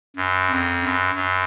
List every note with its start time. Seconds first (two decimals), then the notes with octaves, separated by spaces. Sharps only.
0.16 F#2
0.50 F2
0.83 F#2
1.15 F#2